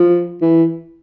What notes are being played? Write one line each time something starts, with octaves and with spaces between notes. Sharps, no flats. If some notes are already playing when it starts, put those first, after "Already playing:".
Already playing: F3
E3